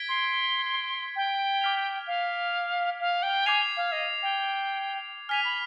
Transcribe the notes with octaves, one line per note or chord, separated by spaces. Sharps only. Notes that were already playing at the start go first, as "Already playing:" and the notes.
Already playing: G#6 B6 D7 G7
C6
G5
D6 F6 B6 F7
F5
F5
G5
G#5 D6 G#6 C7 F7
F5
D#5
G5
G#5 F6 B6 F7
B5